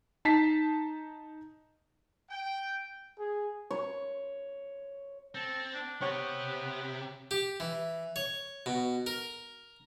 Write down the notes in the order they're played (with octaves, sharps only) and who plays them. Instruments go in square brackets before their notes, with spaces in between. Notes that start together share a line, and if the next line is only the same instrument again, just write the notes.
[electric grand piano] D#4 A5 B6 C7
[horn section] G5
[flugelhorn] G#4
[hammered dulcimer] C#5
[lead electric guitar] C4 [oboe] A4
[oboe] D4
[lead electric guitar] C3 [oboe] B3 [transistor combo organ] G4 [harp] C#5 G5 G6
[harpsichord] G4
E3
C#5
B2
A#4